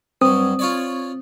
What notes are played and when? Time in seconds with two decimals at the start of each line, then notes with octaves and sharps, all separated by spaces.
0.21 G2 F#3 C4 D#6
0.59 F4 C#5 D5